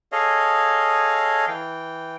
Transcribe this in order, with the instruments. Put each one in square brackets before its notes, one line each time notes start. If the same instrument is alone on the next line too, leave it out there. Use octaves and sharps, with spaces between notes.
[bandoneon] G#4 A4 C#5 D#5 F5
E3 G5